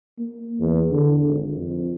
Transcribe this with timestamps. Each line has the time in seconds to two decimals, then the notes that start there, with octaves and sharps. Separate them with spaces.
0.19 A#3
0.60 E2
0.92 D3
1.27 G#1
1.56 F2